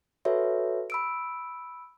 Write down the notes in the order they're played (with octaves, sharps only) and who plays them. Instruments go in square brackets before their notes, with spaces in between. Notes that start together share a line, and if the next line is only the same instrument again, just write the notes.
[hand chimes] F#4 A4 B4 C#5 E5
B5 E6 D7